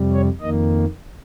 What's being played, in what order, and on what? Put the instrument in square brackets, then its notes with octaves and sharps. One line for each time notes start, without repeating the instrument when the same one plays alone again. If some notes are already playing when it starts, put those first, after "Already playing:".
Already playing: [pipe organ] F2 C3 G3
C#5
F2 D#3 A#3 D#5